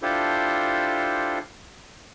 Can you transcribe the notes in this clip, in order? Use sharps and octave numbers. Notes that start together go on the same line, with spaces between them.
D4 E4 F4 G4 A4 C5